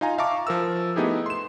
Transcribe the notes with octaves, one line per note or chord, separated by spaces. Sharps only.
D#4 F4 F5 G#5 A#5
E5 F5 A5 A#5 C#6 D6
F3 A#4 E6
A3 B3 D#4 E4 G4 G#4
C6 E7